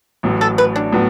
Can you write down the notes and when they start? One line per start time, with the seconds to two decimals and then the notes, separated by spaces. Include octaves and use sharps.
0.23 A1 A2 F#3
0.41 A4
0.58 B4
0.76 D4
0.93 A2 F#3 B3